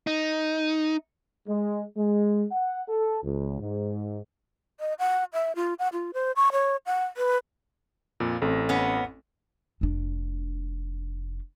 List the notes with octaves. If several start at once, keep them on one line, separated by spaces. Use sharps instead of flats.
D#4
G#3
G#3
F#5
A4
C#2
G#2
D#5
F#5
E5
F4
F#5
F4
C5
C#6
C#5
F#5
B4
F2 A#2
A1 A3 C4
B3 C#4
F1 D4